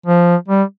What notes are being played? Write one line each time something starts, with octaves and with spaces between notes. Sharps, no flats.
F3
G3